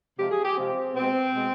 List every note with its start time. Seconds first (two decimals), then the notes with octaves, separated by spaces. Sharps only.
0.18 C3 F3 G#3 G4
0.31 G#4
0.44 G4
0.57 C3 F3 G#3 C4
0.95 B2 G#3 C4
1.34 B2 G#3